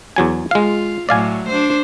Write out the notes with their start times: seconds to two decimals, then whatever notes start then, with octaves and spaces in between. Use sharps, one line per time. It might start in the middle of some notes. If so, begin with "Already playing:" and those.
0.16 E2 F#3 G#5
0.51 G#3 F4 F5
1.09 A2 F#3 D5 F5 G#5
1.48 D4 C5